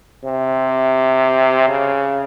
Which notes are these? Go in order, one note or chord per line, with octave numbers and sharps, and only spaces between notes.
C3
C#3